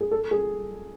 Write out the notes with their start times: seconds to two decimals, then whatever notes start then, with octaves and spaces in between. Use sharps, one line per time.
0.01 G#4
0.11 A4
0.31 G#4